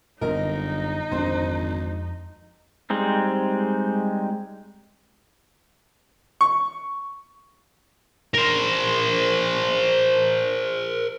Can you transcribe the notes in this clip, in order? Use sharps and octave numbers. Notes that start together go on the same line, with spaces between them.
G1 F#2 D3 C4 D#4 A#4 D#5
G#1 F2 D3 C5
G3 G#3 C4 D#4
C#6
A#4 C5